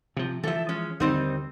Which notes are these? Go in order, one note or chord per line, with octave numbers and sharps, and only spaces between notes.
C3 F3
E3 F3 A4 E5
G#3 C#4
D#2 D3 G3 C4 D#4